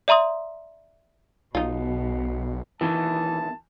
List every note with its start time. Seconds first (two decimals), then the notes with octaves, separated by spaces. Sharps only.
0.08 D5 E5 A#5 C6 D#6
1.55 B1 B2 D#4 F4
2.81 E2 B2 D#3 E3 A5